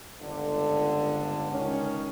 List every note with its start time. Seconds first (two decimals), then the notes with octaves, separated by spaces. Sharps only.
0.22 G1 C#2 D3
1.52 C#2 D#3 C#4